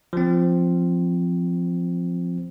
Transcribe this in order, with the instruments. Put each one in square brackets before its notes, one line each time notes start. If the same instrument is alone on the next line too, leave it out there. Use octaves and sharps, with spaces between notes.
[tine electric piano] F3 C4